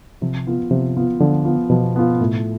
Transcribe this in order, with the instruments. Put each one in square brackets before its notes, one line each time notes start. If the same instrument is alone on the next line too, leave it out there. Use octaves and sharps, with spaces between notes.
[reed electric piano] C3 [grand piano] F3
[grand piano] B3 F4
[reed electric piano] C3 [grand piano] F3
[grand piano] B3 F4
[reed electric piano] D3 [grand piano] F3
[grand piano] B3 F4
[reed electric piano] B2 [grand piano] F3
[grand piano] B3 F4
A2